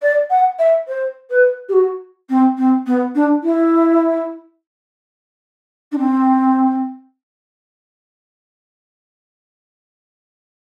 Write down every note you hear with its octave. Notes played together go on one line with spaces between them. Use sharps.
D5
F#5
E5
C5
B4
G4
F#4
C4
C4
B3
D4
E4
D4
C4